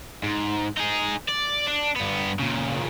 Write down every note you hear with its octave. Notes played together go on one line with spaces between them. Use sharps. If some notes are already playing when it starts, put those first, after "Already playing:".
G#2
D#4 G#4
D5
D4
G2 B3
A#2 C#3